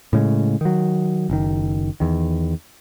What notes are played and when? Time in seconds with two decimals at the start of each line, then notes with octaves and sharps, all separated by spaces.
0.13 A2 C#3 G#3
0.61 D#3 F#3
1.30 F#1 D#3
2.00 E2 D#3